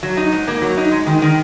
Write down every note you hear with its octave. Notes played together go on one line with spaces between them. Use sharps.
F#3
D#4
G#2
A#3
F#3
D#4
G#3
D#3
D#3